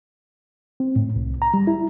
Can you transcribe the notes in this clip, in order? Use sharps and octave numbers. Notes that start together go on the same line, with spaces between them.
C4
A2
C2
A#5
G3
E4